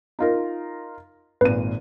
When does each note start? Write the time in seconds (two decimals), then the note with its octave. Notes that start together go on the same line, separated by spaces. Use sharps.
0.19 D#4 F4 A#4
1.41 G#1 A#2 B4 D#7